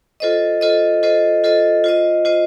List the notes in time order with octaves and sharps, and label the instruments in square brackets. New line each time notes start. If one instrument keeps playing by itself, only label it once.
[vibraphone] F4 A4 C5 D#5
F4 A4 C5 D#5
F4 A4 C5 D#5
F4 A4 C5 D#5
F4 C5 D#5
F4 C5 D#5